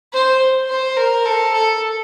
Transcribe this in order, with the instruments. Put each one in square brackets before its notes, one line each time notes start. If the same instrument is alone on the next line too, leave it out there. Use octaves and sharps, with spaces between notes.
[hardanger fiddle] C5
C5
A#4
A4
A4